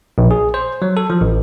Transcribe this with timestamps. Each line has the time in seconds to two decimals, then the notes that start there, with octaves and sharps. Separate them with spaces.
0.18 A#1
0.31 G#4
0.54 C5
0.82 F#3
0.97 A4
1.10 F3
1.21 A1